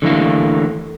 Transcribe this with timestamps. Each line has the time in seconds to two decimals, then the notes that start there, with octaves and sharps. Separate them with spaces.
0.02 D3 E3 A3 A#3